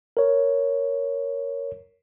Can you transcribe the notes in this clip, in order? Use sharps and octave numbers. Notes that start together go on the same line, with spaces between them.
A#4 C#5